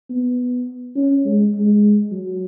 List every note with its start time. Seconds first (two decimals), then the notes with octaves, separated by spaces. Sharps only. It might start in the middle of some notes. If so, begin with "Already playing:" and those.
0.10 B3
0.96 C#4
1.25 G#3
1.54 G#3
2.11 F#3